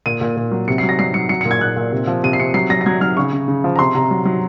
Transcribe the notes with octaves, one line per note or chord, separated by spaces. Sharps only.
A#2 D#7
A#2
A#2
F#3
C3 C#7
C7
F#3
A#6
F#3 C7
F#3 C#7
F#3 C#7
A#2 C#7
G#6
A#2 F#6
A#2
C3
F3
C3 D#7
C7
C3 C#7
F#3 C7
F#3 A#6
A#6
F#3 G#6
F#3 F6
C#3 C#6
C#3
C#3
F3
A#5
C3 C6
C3 A#5
F#3
F#3